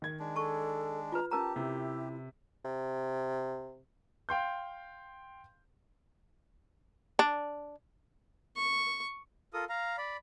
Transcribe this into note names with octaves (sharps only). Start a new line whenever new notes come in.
D#3 G#6
G#3 D4
A4 A5 C#6
F4 B4 A#5
C#4 G4 A#4 A5 A#5
C3 E4
C3
F5 G5 C6 G6
D4
C#6
F4 A4 A#4 D#6
F5 A#5
D5 B5